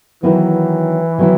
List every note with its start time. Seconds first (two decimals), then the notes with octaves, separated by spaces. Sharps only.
0.23 D#3 E3 F#3 B3 E4
1.18 D#3 F#3 B3 E4